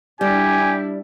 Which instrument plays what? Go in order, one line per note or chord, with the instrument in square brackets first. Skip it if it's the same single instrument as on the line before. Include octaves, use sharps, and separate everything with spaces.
[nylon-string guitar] G3 [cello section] D4 E4 D5 [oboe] G4 [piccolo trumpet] G#5